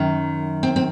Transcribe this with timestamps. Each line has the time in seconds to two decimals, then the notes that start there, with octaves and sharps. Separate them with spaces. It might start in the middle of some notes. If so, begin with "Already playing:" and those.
Already playing: F#2 D#3
0.63 C4
0.76 C4